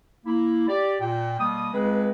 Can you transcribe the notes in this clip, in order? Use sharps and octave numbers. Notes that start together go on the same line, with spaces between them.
A#3 E4
G4 D5
A#2 G5
B2 G3 A#3 D#6
C#2 C#3 G#3 C4 B4